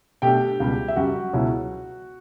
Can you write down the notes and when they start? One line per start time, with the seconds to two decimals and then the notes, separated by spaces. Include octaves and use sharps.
0.22 B2 A3 D4 G4 G5
0.60 C#2 B2 G3
0.88 E5
0.96 F#2 C#3 G3 F#4 F#5
1.33 C#2 B2 F#3 C#4 E4